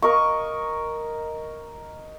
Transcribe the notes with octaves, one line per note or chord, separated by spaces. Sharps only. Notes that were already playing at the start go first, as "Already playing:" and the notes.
A#4 D#5 C#6